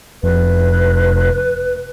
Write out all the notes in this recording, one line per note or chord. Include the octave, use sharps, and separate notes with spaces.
F1 B4